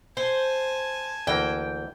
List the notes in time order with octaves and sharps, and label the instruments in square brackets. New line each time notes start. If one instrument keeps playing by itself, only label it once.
[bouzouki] C5 [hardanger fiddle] G#5 A5
[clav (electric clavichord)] D2 E3 A#3 [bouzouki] G5